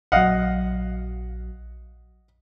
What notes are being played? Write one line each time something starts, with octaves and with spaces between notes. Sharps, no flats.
A#1 F#3 D#5 F5 F#5